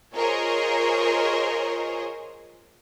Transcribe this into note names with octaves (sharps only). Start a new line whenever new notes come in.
F4 G#4 A#4 C5 C#5 D#5